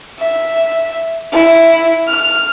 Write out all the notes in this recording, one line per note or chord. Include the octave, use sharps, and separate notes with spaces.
E5
E4
F6